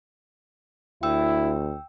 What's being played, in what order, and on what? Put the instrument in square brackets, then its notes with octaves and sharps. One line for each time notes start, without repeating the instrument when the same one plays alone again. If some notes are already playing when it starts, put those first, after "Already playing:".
[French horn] D2 [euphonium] E4 [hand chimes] G5 E6